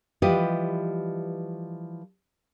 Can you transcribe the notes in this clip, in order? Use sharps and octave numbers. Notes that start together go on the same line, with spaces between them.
E3 F3 G3 G4 B4 D#5